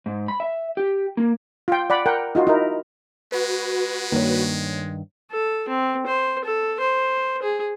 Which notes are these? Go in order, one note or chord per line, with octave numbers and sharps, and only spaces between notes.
G#2
B5
E5
G4
A#3
F4 G5
D5 F#5 B5
A#4 F#5 G5
D#4 F4 F#4
D#4 E4 A#4
G#3 F#4 B4
G2 D#3 A#3 C#5
A4
C4
C5
A4
C5
G#4